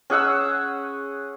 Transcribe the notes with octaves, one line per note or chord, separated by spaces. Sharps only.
C#4 G#4 F#5 E6